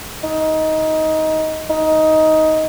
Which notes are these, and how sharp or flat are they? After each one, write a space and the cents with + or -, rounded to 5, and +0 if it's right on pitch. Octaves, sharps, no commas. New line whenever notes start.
D#4 +15
D#4 +10